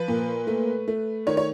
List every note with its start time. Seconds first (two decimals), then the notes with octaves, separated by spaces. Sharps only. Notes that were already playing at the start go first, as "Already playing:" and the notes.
Already playing: F3 B4
0.08 A#2
0.47 A3
0.88 A3
1.27 D#3 C#5
1.37 C#5